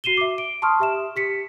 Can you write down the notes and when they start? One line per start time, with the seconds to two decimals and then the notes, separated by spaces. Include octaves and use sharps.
0.04 F#4 C7 D#7 E7 G7
0.17 E5 D6
0.38 D7
0.62 A5 C6 C#6 D#6 F6
0.80 G4 E5 E7
1.16 G4 B6 C#7